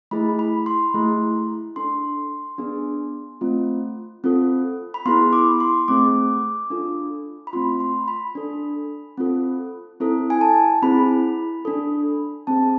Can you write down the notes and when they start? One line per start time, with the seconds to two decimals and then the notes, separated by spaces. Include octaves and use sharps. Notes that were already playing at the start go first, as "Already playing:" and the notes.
0.11 A3 E4 G#4 B5
0.39 B5
0.66 C6
0.94 A3 E4 G#4
1.76 D4 A4 C6
2.58 B3 D4 G#4
3.41 A3 C4 F4
4.24 C4 F4 A4
4.94 B5
5.06 B3 E4 G#4 C6
5.33 D6
5.60 C6
5.88 A3 C4 G#4 D6
6.70 D4 F4 A4
7.47 B5
7.53 A3 C4 F4 C6
7.80 C6
8.08 B5
8.35 D4 A4
9.17 C4 F4 A4
10.00 C4 E4 A4
10.30 G#5
10.41 A5
10.82 C4 E4 G#4 B5
11.65 D4 A4
12.47 C4 G#4 A5